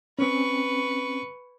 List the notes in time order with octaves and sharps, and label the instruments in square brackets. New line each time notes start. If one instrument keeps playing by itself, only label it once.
[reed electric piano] C4 C#4 [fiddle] B4 C#6